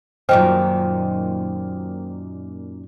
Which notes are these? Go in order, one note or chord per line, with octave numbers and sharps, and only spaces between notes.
F#2 A#2 D#3 C5 G5